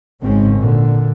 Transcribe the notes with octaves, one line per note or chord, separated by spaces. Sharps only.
G#1 G#2 C#3 G#3 C4 C#4
A#2 D3